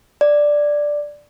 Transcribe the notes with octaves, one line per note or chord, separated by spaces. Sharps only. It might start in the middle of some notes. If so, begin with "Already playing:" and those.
D5